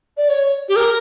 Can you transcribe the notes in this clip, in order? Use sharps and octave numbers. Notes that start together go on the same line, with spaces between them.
D5
C#5
G4
A#4